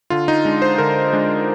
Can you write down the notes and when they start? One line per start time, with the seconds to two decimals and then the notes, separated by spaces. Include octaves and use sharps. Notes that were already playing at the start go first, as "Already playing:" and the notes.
0.10 D3 F4
0.28 D#4
0.45 G#3 D4
0.62 C5
0.78 D3 A#4
1.13 G#3 D4